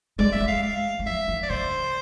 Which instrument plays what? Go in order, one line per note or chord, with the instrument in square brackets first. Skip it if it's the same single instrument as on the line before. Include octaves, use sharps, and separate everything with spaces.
[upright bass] G#3 [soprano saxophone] D5
[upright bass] A3 [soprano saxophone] E5
[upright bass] G#3
[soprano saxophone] F5
F5
[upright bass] G#3
[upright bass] F3 [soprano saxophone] E5
[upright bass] E3
[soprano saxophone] D5
[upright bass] D3 [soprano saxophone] C5